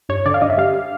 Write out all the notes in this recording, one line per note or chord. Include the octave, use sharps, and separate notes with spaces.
G2 C#5
D3 D5
F5
G2 D#5
E5
G3 F5